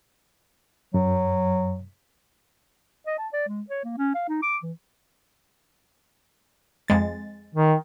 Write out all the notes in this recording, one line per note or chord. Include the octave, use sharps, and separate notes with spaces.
F#2 F#3
D#5
A5
D5
G#3
C#5
A#3
C#4
F5
D#4
D6
E3
F2 G#3 A6
D#3